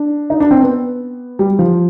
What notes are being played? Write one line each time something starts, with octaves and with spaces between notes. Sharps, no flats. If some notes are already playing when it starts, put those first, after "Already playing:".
Already playing: D4
D#4
D4
C4
B3
G3
F3